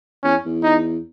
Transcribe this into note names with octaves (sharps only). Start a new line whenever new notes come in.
E2 C#4
E2
D#4